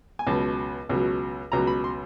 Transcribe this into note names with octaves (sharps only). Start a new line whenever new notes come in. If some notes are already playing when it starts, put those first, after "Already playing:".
G#5
C#2 B2 F#3 A5
C#2 B2 F#3
C#2 B2 F#3 A#5
B5
C6